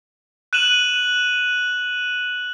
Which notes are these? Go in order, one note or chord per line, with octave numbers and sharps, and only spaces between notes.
F#6 D#7 E7 F#7